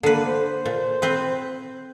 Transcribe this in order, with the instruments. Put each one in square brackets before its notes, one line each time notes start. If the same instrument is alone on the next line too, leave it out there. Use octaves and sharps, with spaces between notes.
[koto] D3 B4 [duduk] A#3
[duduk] C5
[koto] A#2
C4 B4